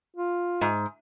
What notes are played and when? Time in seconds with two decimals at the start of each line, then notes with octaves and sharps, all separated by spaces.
0.16 F4
0.61 G#2